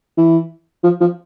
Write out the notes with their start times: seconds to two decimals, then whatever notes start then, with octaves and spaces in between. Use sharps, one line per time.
0.17 E3
0.84 F3
1.00 F3